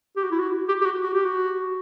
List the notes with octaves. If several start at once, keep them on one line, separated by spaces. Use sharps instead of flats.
G4
F#4
E4
F#4
G4
G4
F#4
F#4
G4
F#4